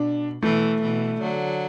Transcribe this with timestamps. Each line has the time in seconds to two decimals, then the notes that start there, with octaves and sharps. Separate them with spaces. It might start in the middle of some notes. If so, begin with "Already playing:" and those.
Already playing: B2 D4
0.42 B2 E3 A3
0.82 B2 E3
1.21 D3 F#3